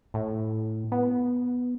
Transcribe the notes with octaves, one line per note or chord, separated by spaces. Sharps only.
A2
B3